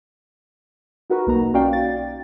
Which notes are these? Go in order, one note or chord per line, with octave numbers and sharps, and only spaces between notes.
D#4 F#4 A#4 B4
B1 A#3 D#4 A#5
C#4 F#4 D5 F5 G5
A6